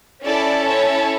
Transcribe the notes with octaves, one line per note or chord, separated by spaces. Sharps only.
C#4 E4 A4 D5
C#5